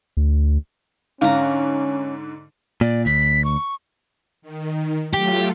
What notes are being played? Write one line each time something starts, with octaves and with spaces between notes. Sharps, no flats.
D2
G#2 D3 C#4 F5 A#5
A#2 D5
D2 B6
C#6
D#3
F#3 A3 F4 G4